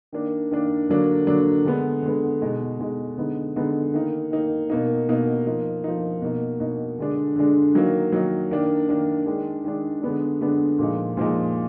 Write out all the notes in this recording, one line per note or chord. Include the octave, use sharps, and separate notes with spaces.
D#3 A#3 D4
D#3 A#3 D4
D3 F#3 A#3 D4
D3 F#3 A#3 D4
D3 G#3 B3
D3 G#3 B3
B2 G#3 D#4
B2 G#3 D#4
D3 G#3 B3 D#4
D3 G#3 B3 D#4
D#3 A#3 D#4
D#3 A#3 D#4
B2 A#3 D#4
B2 A#3 D#4
F3 A#3 D#4
F3 A#3 D#4
B2 A#3 D#4
B2 A#3 D#4
D3 G#3 D4
D3 G#3 D4
D#3 F#3 A#3 D#4
D#3 F#3 A#3 D#4
D#3 A#3 D4
D#3 A#3 D4
D#3 G#3 D4
D#3 G#3 D4
D3 G#3 B3 D4
D3 G#3 B3 D4
A#2 F3 G#3 D#4
A#2 F3 G#3 D#4